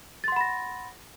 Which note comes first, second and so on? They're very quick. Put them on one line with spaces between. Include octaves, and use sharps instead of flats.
A6 C6 F#5 B5 A#6